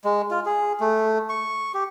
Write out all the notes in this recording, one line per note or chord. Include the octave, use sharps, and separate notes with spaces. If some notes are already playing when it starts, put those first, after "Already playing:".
G#3
F4
G#4
A3
C#6
G4